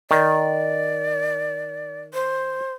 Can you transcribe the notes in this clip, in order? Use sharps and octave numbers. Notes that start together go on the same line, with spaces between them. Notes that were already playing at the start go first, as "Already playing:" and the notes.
D#3 D5
C5